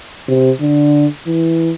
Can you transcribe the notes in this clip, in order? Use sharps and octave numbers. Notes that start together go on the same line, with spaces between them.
C3
D3
E3